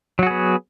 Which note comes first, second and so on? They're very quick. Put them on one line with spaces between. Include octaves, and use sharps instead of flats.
F#3 F#4 G#4 B3